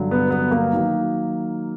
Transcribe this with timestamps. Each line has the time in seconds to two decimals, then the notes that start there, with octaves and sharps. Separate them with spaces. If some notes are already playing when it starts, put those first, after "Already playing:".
Already playing: G2 D3 F#3
0.11 B3
0.30 B3
0.51 A#3
0.73 D#3 F#3